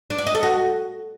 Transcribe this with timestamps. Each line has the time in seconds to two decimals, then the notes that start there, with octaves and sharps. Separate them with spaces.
0.10 D4
0.18 D5
0.27 D#5
0.35 A4
0.43 F#4